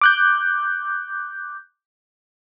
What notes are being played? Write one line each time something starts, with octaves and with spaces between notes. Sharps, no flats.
D6 F#6 G6